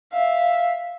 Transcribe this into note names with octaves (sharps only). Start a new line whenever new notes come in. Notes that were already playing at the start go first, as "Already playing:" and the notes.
E5 F5